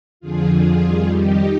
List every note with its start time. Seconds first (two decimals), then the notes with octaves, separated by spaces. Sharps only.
0.20 F2 D3 F3 F4 G#4
0.52 F4 G#4
0.82 F2 D#3 G3
1.13 D#4 G4